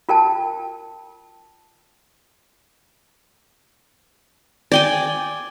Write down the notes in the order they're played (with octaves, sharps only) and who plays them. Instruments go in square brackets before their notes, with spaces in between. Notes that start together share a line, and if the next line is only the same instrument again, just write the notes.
[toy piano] F4 A#4 G5 A5
[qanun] D5 G5 G#5